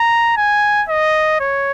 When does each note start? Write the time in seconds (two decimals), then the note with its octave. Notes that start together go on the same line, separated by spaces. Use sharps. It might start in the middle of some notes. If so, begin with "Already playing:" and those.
Already playing: A#5
0.37 G#5
0.89 D#5
1.40 C#5